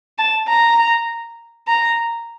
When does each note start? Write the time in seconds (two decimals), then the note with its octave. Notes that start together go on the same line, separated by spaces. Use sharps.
0.18 A5
0.48 A#5
1.67 A#5